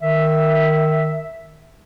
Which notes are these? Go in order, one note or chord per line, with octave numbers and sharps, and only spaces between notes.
D#3 E5